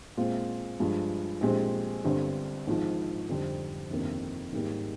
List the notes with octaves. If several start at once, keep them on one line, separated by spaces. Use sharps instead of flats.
A#2 G#3 C4 F4
G2 F3 G#3
A#1 A#2 G#3 C4 G4
G1 G2 D3 G3 C4
G#1 G#2 F3
F2 D3 G3 C4 G4
G1 F2 C3 D#3 A#3
G#1 G#2 G3 A#3